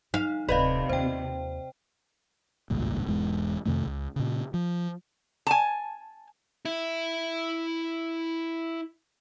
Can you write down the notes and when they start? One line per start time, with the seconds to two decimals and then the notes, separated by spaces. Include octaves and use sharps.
0.14 D3 D#4 F5
0.49 D1 C3 B4 D5 D#5 F5
0.89 D#2 F4 C5 G5
2.70 G#1 C#2 G2 A#2
3.06 E1 E2 G#2 G#3
3.66 F2 C3 D#3 A3
3.87 C#2
4.16 A#2 C#3
4.54 F3
5.47 G#5 A5
6.65 E4 E5